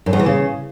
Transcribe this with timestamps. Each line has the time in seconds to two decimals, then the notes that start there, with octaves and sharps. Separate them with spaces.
0.06 F#2
0.13 E2
0.20 E3
0.26 C#3